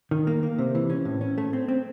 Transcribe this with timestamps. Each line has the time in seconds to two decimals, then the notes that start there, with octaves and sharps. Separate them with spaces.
0.11 D#3
0.27 A#3
0.43 A#3
0.58 C3
0.75 E3
0.90 C#4
1.05 A2
1.21 C#4
1.38 A3
1.53 C4
1.68 C4